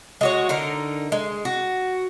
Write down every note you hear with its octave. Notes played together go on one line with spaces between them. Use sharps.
G#3 F#4 C#5
D3 D#4 A#4
G#3
F#4